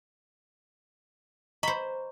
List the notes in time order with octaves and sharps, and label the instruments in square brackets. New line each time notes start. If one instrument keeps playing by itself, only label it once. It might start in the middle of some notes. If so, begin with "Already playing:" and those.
[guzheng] C5 B5 [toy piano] D#5 A#5 C#6